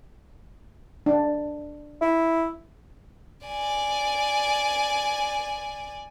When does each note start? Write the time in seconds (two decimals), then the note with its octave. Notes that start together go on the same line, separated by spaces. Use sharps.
1.06 D4
2.01 E4
3.46 D5 G#5